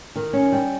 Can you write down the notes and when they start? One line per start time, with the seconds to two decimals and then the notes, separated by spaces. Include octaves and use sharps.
0.16 D#3
0.33 C#4
0.52 G3